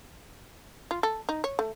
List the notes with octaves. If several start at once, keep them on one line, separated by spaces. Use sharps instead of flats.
F4
A4
D#4
C#5
A3